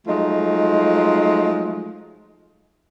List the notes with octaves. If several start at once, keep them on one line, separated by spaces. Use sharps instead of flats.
F3 F#3 G#3 A3 D#4